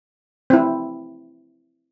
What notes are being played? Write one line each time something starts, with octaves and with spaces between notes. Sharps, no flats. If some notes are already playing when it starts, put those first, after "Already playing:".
C4 E4